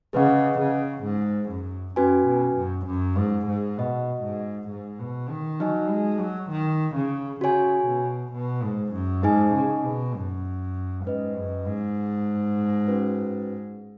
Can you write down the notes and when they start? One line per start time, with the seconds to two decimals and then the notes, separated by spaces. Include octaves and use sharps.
0.13 C#3 G#4 B4 D#5 F#5
0.60 C#3
1.05 G#2
1.50 F#2
1.96 F#2 C#4 F#4 B4 G#5
2.26 B2
2.57 F#2
2.87 F#2
3.17 G#2
3.48 G#2
3.78 B2 F#4 D#5 F#5
4.23 G#2
4.69 G#2
4.99 B2
5.29 D#3
5.60 F#3 D#4 F#4 D#5 G#5
5.90 G#3
6.20 F#3
6.51 D#3
6.96 C#3
7.41 C#3 F#4 C#5 G#5
7.88 B2
8.33 B2
8.63 G#2
8.93 F#2
9.23 G#2 D#4 G#4 D#5 G#5
9.54 C#3
9.84 B2
10.15 F#2
11.05 G#2 C#4 B4 D#5
11.36 F#2
11.66 G#2
12.88 C#4 F#4 B4